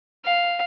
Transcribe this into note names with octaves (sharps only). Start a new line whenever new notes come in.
F5